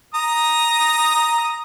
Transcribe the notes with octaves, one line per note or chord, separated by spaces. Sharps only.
A#5 D#6